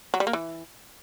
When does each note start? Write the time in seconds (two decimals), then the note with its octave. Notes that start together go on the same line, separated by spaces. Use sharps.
0.14 F#3
0.20 G3
0.27 A#3
0.33 E3